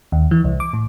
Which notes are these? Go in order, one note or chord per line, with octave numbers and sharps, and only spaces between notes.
D#2
E3
C2
D6
A2